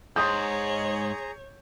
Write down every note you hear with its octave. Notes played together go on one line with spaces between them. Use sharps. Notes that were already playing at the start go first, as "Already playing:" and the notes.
G#2 G#4 C#5 A#5 C6 D#6 G6